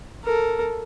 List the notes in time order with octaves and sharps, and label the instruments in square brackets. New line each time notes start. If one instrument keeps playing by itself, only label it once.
[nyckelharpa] A4 A#4